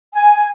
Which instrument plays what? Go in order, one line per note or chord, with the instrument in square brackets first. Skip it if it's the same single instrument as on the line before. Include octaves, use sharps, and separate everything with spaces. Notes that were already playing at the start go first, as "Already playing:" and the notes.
[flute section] G#5